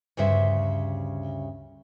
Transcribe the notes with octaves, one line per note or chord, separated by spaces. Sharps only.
D2 G2 C#3 C5 E5